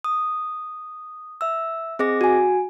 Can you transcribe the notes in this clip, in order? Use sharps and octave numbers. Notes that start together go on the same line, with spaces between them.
D#6
E5 E6
C4 G#4 D#5 D6 A#6
F#4 G#5